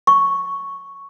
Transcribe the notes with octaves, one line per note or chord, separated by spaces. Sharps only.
C#6